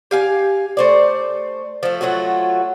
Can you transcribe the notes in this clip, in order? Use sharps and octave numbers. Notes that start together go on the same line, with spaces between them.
G4 F5 G#5
A3 C5 D5
F3 A3
F#3 A3 F4 F#4